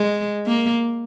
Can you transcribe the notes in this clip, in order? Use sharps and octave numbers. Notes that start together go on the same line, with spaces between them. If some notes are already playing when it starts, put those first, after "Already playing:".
Already playing: G#3
A#3